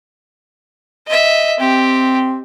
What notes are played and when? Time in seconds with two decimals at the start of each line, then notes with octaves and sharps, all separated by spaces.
1.07 D#5 E5
1.60 C4 G4